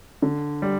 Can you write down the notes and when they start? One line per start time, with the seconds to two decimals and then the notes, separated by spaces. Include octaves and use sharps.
0.22 D3
0.62 G3